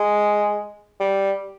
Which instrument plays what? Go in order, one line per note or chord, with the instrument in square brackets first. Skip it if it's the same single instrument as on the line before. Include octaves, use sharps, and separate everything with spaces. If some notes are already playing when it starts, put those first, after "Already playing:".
Already playing: [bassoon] G#3
G3